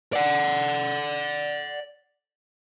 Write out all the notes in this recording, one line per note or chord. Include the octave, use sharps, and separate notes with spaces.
D5 F#5